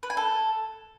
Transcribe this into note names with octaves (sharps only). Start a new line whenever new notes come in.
B4
G#5
A4